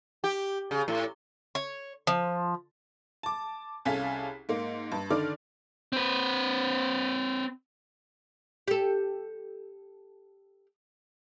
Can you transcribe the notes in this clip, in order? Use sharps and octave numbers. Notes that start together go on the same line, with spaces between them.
G4
C#3
A2
C#5
F3
A5 D6
C2 C#4 G#4 A4 F5 B6
G#2 A#3
G2
D3 D#3 D5 D6 F6
C4 B4
G4 A4